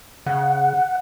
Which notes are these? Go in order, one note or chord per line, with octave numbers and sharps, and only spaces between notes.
C#3 F#5